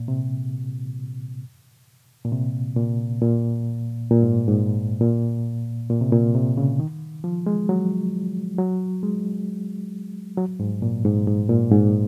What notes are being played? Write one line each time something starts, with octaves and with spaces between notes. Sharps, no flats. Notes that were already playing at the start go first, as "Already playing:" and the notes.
Already playing: A#2
C3
A#2
C3
A#2
A#2
A#2
G#2
G#2
A#2
A#2
C3
A#2
C3
C#3
D#3
F3
G#3
F#3
F#3
G#3
F#3
G#2
A#2
G#2
G#2
A#2
G#2